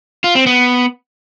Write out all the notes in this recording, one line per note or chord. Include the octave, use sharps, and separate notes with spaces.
F4
C4
B3